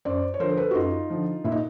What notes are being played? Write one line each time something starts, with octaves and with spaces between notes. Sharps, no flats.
F#2 C5 D5
C#5
D3 F3 A#4 C5
A#4
A4 B4
F#4
F#2 D#4 F4
D3 F3
A#2 E4
D#4